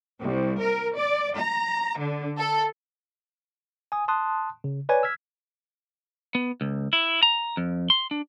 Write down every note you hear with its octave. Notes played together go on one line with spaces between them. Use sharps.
C2
A#4
D5
A#5
D3
A4
G#5 D#6
A5 C6 D#6 F#6
C#3
B4 C#5 D5 G#5 G#6
E6 F6 G#6 B6
B3
C#2
E4
A#5
F2
C6
D4